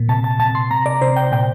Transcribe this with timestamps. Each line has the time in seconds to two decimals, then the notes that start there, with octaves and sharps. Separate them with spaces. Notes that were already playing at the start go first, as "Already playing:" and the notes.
Already playing: A#2
0.09 C3 A5
0.24 A5
0.39 C3 A5
0.55 C6
0.71 C3 A#5
0.86 D5
1.02 C3 C5
1.16 G5
1.32 A#2 G5